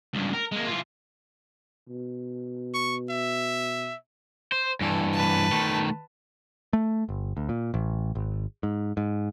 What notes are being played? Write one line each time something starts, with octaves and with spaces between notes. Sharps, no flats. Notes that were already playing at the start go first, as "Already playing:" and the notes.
C#2 G2
A#4
G#3 A#3
E3 F4
B2
C#6
E5
C5
G2 E3 A4
B4 A5
D#3 A3
A3
G1
D2
A#2
A1
G#1
G#2
G#2